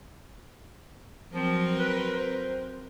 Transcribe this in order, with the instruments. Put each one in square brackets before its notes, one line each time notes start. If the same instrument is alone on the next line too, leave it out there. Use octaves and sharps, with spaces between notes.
[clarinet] F3 [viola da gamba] F#3 C4 A#4
[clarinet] B4
C5